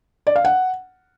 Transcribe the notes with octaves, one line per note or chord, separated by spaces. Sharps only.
D5
F5
F#5